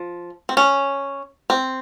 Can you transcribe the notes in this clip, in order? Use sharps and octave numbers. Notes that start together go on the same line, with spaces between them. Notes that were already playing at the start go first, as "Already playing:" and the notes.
Already playing: F3
C4
C#4
C4